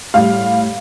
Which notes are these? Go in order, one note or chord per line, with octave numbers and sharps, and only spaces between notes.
A2 G3 F5